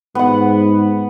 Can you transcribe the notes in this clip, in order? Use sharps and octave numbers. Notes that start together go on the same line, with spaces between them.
G#2 B3 F#5